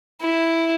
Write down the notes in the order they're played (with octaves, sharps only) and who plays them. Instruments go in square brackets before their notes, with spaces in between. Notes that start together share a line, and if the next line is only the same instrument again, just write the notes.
[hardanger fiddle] E4